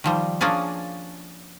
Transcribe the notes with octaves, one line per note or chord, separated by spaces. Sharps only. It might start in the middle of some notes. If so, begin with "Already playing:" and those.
D#3 F3 G3
F3 A#3 C#4 D4 G#4 F5